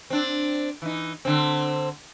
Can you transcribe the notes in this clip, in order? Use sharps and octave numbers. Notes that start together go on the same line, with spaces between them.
C4 D4
E3 D#4
D3 C4